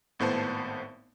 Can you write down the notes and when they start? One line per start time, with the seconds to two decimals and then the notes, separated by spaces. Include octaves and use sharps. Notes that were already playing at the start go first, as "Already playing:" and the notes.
0.19 G#1 A2 B3 C5 A5